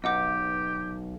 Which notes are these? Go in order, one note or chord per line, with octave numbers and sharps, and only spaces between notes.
B1 G4 D#5 F#5 D6